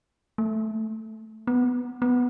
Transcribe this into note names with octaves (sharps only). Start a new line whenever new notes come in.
A3
B3
B3